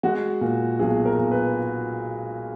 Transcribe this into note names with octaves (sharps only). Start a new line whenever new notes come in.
G#3 F#4
A#2
B1 G#4
A#4
B1
B4